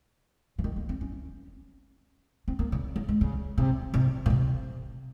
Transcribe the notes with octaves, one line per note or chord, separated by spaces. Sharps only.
F3
D#3
A#3
C4
C#4
C4
A#3
C#3
F#3
G#3
C#3
C3
C3
A#2
C3